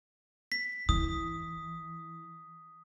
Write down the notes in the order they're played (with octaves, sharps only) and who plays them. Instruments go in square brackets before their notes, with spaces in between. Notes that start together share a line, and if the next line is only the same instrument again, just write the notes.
[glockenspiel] B6
[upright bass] E3 [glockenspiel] D#6